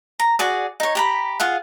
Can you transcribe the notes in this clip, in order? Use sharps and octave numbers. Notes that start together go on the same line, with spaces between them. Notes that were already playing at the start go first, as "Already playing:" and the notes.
A#5
F#4 G#4 D5
D#4 C#5
G4 A#5 B5
F4 G#4 F5 F#5